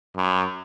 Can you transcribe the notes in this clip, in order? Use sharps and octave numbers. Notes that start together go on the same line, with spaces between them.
F#2